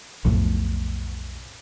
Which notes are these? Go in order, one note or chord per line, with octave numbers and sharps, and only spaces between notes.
B1 F2 A2